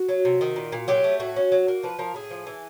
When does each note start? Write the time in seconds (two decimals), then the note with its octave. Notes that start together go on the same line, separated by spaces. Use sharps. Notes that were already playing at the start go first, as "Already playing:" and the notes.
Already playing: F#4
0.09 F#3
0.25 C3
0.41 D#3
0.56 A#2
0.72 A#2
0.88 F#3 G4
1.04 A3
1.20 A2 F#4
1.36 C#4
1.52 F#3
1.68 A#3
1.83 F3 B4
1.99 F3 A#4
2.15 A2 G#4
2.31 F3
2.47 E3